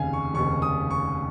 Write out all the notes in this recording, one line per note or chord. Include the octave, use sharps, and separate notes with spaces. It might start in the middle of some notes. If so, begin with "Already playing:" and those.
Already playing: F1 D#2 C#3 F5 G#5
C#6
F1 D#2 C#3 C#6
D#6
C#6